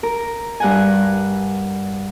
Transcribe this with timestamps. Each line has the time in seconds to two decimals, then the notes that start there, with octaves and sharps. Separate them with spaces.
0.03 A#4
0.60 G2 F#5 G#5